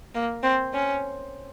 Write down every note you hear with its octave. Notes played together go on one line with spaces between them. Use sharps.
A#3
C4
C#4